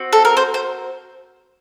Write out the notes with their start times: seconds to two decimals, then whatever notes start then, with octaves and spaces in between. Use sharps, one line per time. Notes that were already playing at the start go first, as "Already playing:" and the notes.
Already playing: C4 F#4
0.13 A4
0.25 A#4
0.37 C5
0.54 C5